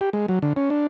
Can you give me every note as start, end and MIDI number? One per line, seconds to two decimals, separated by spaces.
0.01 0.10 67
0.13 0.26 56
0.28 0.39 54
0.42 0.53 50
0.56 0.70 61
0.70 0.87 62